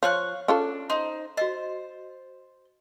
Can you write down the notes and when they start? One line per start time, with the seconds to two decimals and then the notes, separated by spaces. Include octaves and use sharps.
0.03 F3 C#5 F5 C#6 F#6
0.48 C#4 D4 F4 A4
0.90 D#4 C5 C6
1.37 F#4 C5 D#5